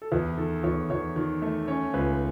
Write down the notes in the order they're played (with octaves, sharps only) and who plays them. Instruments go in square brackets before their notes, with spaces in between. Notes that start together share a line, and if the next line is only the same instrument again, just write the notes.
[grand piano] A4
E2 B4
D#3 A4
E2 C#5
E2 C#5
D#3
A3
C#4 C#5
C#2 B4